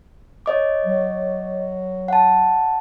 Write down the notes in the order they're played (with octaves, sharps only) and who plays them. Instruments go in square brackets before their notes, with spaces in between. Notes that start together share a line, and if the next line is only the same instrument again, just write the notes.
[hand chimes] C#5 D#5 D6
[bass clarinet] F#3
[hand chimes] F#5 A5